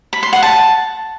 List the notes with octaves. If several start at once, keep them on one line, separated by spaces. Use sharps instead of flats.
B5
C6
F#5
A5